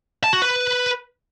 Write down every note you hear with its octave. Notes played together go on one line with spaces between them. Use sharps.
A5
F#4
B4